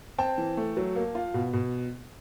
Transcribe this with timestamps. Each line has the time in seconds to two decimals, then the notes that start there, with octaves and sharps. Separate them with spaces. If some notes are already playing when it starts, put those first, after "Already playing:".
0.18 C4 G5 A5
0.38 E3
0.57 A3
0.77 F#3
0.96 A#3
1.15 F4
1.34 B2
1.53 B2